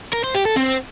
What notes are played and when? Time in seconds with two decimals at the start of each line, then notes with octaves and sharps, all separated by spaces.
0.13 A#4
0.24 C5
0.35 G4
0.45 A4
0.56 C4